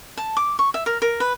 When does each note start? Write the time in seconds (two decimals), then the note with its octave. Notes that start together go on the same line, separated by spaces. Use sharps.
0.17 A5
0.37 D6
0.59 C#6
0.74 E5
0.86 A#4
1.02 A#4
1.20 B4